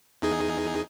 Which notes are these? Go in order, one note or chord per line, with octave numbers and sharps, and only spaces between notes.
E2 D#4 G#4